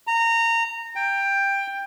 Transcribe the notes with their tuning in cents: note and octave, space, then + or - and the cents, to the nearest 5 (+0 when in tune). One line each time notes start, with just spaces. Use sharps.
A#5 -20
G5 +15